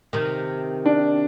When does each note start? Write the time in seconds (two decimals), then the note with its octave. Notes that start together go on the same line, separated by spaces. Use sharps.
0.13 C3 D#3
0.86 D4